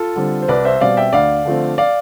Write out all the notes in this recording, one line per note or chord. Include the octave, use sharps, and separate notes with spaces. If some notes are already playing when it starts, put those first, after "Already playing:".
Already playing: F4 A4
D3 G3 C4
C5
C2 B4 D5
C5 E5
B2 G3 C4 D5 F5
E5 G5
D2 D5 F5
D3 F3 A3 C4
D5 F5